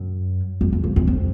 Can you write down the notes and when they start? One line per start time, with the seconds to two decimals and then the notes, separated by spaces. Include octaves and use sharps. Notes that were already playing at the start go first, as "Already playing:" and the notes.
Already playing: F#2
0.61 F2
0.72 E2
0.84 F2
0.96 E2
1.07 F2